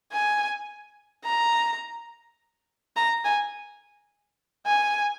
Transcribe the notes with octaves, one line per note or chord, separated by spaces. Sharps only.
G#5
A#5
A#5
G#5
G#5